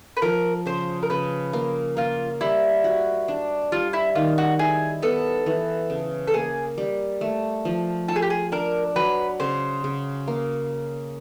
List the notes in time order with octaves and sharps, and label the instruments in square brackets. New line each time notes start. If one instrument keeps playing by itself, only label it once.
[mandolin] B4
[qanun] F3 [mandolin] A#4
[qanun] C#3 [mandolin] C5
[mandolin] A#4
[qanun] C#3 [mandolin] B4
[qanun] A#3
[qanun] A#3 [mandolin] F4
[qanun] G3 [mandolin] E4
[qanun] F#4
D4
[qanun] G3 [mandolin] F4
[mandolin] E4
[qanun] D#3 [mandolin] F4
[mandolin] F#4
[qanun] E4 [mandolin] G#4
[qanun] B3 [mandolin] A4
[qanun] E3
C#3
[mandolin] A4
[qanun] A#3 [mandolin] G#4
[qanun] G3
A3
F3
[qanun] F4 [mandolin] A4
[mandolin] G#4
G4
G#4
[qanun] D4 [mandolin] A#4
[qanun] F#3 [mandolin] B4
[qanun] C#3 [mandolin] C5
[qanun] C#3
A#3